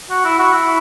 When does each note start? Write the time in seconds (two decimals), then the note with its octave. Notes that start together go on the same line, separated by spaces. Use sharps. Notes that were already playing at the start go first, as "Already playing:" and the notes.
0.10 F#4
0.25 E4
0.39 F#4
0.54 E4